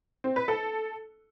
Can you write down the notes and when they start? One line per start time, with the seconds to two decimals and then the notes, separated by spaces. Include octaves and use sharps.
0.24 C4
0.36 B4
0.48 A4